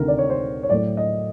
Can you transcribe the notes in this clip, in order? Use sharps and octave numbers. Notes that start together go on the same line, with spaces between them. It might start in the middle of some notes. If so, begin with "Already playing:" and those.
Already playing: D2 C3 D#3 A#4
D5
C#5
C5
C#5
A2 F#3 A3 D5
D#5